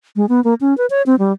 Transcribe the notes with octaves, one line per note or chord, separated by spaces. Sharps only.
G#3
B3
A#3
C#4
B4
C#5
C4
G3